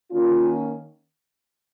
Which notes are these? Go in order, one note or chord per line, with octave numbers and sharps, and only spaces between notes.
D#3 A#3 C#4 F4